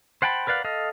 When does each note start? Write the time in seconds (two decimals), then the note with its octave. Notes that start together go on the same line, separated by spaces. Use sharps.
0.22 C5 F#5 G5 A5 B5
0.47 A#4 B4 D5 F5 F#5
0.64 A4 D#5 F5